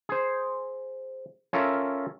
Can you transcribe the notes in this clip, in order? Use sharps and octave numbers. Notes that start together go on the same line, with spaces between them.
G#4 C5
C#4 F4 A4 A#4 E5